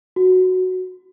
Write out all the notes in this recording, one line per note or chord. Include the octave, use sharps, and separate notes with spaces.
F#4